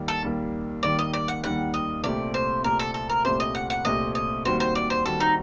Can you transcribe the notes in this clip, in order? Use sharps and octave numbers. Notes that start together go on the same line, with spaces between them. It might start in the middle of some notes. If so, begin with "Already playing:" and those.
Already playing: D#2 D#3 G3 A#3
A4
D#2 D#3 G3 A#3
D#2 D#3 G3 A#3 D5
D#5
D5
F#5
D#2 D#3 G3 A#3 F#5
D#5
C2 A#2 A3 C4 G4 D5
C5
C2 A#2 A3 C4 G4 A#4
A4
A4
A#4
C2 A#2 A3 C4 G4 C5
D#5
F#5
F#5
C2 A#2 A3 C4 G4 D#5
D#5
D#2 D#3 G3 C4 F#4 C5
C5
D5
C5
D#2 D#3 G3 C4 F#4 A4
D#4